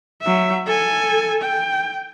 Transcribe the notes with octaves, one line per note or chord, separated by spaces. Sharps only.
F#3 E5
A4 G#5
G5